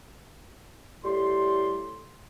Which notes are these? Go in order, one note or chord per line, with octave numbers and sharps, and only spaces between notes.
A2 G3 C6